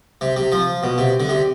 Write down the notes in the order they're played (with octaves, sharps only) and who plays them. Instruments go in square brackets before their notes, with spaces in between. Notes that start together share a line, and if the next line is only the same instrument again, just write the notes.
[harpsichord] C3
C3
F3
B2
C3
D3
C3